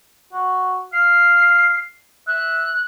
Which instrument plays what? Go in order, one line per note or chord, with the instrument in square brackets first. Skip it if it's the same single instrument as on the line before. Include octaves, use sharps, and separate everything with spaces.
[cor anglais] F#4
[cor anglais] F5 [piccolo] C7
[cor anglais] E5 [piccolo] F#6